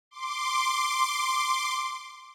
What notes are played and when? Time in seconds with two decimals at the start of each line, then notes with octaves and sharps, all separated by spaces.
0.11 C6 D6